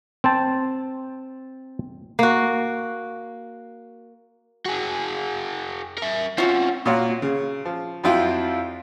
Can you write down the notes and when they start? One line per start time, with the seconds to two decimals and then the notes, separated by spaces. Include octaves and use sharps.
0.24 C4 C5 A5
2.19 A#3 F#4
4.66 F#4 G#4
5.98 A#4 E5
6.38 C4 C#4 F4 F#4
6.86 A#2 F4 F#4 C#5 F#5
7.22 C#3
7.65 F3
8.04 F2 F#3 E4 F4 G5